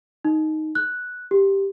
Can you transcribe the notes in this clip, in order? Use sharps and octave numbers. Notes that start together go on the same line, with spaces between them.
D#4
F#6
G4